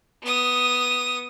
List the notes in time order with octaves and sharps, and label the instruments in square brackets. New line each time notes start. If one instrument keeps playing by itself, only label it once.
[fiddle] B3 D#6